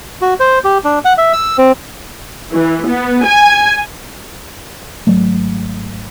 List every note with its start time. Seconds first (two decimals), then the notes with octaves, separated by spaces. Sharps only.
0.22 F#4
0.40 C5
0.64 G4
0.84 D4
1.05 F#5
1.18 E5
1.33 E6
1.58 C4
2.52 E3
2.87 B3
3.25 G#5
5.07 G#1 F#3 A3